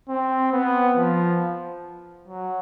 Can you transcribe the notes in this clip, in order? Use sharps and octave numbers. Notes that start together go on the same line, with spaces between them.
C4
B3
F3
F#3